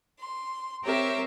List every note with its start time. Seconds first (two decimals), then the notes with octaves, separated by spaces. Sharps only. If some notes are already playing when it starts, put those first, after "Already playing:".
0.19 C6
0.84 C4 G4 A#4 C#5 E5